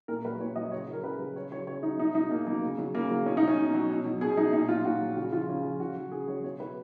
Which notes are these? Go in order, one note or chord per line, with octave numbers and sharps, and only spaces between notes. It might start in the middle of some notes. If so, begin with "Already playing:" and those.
A#2 A#4
F#3 B4
A#2 C#5
F#3 D#5
C#3 C#5
F#3
A#4
C#3 B4
F#3
C#3 C#5
F#3 C#5
C#3 C#5
F#3 D#4
B2 D#4
F#3 D#4
B2 A#3
F#3 A#3
C#3
F#3
C#3 A#3
F#3
B2 C#4
D#4
F#3
C#4
B2
F#3
B2
F#3
B2 G#4
F#3 D#4
A#2 D#4
F#3 F4
A#2 F#4
F#3
C#3 F#4
F3 F4
C#3 C#4
F3 F4
C#3 F#4
F#3
C#3 G#4
F#3 C#5
B2 C#5
F#3 B4